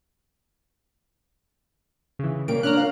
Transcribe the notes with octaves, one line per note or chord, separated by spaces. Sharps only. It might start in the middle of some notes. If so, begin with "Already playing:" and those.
C#3 E3
C#3 G3 A#3 D7
C#4 D4 A#5 F6 F#6
F5